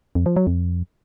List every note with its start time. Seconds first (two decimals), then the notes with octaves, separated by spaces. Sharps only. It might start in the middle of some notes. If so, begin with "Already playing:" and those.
0.15 F2
0.26 F3
0.36 F#3
0.47 F2